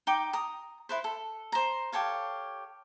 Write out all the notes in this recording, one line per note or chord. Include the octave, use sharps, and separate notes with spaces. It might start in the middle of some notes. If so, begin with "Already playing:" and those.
D#4 G5 D6
A#5 D#6
E4 B4 C5
A4
C5 A#5
G4 A4 C#5 F5